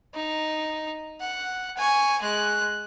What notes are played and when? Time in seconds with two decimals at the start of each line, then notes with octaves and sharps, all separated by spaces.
0.14 D#4
1.20 F#5
1.77 G#5 C#6
2.22 G#3 F#6